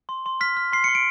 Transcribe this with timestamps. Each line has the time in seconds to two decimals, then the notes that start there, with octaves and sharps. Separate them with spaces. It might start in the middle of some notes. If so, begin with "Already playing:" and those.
0.09 C6
0.26 C6
0.41 F6 B6
0.57 F6
0.73 C6 C7
0.84 C#7
0.88 C6
0.95 D7